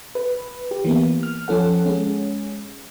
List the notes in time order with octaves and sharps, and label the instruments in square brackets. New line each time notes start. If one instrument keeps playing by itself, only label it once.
[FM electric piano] B4
G4
E3 A#3 B3
F6
F3 C#4 A4 F#5
G#3 C#4